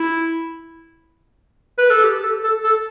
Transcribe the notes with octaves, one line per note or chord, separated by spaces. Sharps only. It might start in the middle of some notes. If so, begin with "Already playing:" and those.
Already playing: E4
B4
A4
G4
A4
A4
A4